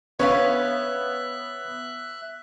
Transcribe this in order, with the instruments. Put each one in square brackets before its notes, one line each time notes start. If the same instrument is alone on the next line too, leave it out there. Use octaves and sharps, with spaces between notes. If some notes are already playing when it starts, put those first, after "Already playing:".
[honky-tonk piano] B3 [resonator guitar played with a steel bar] C#4 B4 F5 [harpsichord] C#5 [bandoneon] E5 F#6